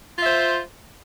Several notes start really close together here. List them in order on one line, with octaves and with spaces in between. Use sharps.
F4 E5 C5